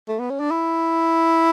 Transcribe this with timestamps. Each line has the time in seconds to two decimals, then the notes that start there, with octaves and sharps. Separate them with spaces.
0.09 A3
0.19 B3
0.30 C#4
0.40 D4
0.51 E4